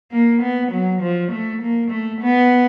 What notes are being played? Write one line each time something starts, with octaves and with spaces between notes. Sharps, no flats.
A#3
B3
F#3
F3
A3
A#3
A3
B3